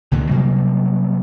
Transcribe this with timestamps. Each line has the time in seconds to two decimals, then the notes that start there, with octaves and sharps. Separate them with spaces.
0.11 C#2 A#2 D3 D#3
0.30 C3 F#3 G3 A#3